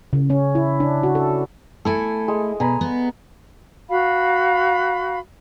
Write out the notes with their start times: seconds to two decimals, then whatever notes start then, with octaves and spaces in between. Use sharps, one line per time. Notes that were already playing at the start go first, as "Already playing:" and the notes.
0.13 C#3
0.30 C#4
0.55 E4
0.80 D4
1.03 F#4
1.15 A4
1.85 A3 E4 A4 G#5
2.28 G#3
2.60 B2 G#5 A#5 B5
2.81 B3
3.88 F#4 F5 B5